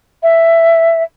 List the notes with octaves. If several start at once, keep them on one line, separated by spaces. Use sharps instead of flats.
E5